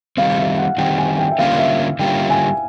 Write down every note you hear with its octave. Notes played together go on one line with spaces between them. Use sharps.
D#3 G3 C4 F5
E5
F#5
D#3 G3 C4 G5
G#5
G5
E5
D3 G3 A#3 C#4 F4 F5
E5
D3 G3 A#3 C#4 F4 G5
G#5